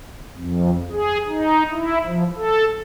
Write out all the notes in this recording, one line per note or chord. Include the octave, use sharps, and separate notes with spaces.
F2
G#4
D#4
E4
F3
A4